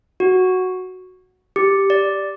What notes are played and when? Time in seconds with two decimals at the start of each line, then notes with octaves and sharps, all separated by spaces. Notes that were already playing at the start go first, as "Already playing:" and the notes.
0.20 F#4
1.56 G4
1.90 D5